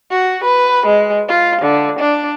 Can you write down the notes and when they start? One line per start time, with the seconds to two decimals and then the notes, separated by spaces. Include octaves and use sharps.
0.11 F#4
0.44 B4
0.86 G#3
1.29 F4
1.62 D3
1.99 D4